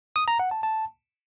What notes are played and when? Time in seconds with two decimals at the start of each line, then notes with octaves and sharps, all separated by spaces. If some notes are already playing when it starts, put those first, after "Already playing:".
0.16 D#6
0.28 A#5
0.39 F#5
0.51 A5
0.63 A5